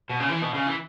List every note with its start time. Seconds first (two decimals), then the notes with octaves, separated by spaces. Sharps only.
0.09 B2
0.20 C#3
0.29 E3
0.42 B2
0.54 C#3
0.67 E3